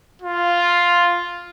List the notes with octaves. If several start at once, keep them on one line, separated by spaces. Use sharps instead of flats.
F4